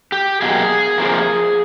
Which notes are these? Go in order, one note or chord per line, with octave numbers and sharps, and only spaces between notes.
G4
B2 F#3 A#3 G#4
F2 C3 F3 A#3